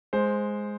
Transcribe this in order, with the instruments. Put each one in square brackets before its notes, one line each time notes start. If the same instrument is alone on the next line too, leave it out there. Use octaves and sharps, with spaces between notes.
[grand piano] G#3 C5